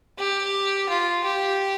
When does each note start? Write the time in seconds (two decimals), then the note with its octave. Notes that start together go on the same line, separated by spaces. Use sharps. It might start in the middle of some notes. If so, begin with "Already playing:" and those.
0.19 G4
0.89 F4
1.24 G4